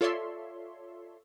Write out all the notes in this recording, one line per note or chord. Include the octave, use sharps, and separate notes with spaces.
F4 A4 C#5 D5 E5 C6